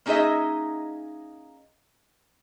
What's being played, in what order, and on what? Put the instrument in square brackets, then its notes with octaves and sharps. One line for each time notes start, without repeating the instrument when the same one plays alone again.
[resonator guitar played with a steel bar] A#3 C#4 D#4 G#4 D#5 E5